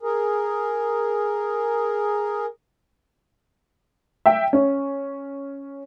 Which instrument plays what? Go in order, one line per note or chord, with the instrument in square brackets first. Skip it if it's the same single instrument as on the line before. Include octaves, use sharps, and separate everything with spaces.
[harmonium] G#4 A#4
[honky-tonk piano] E5 G5
C#4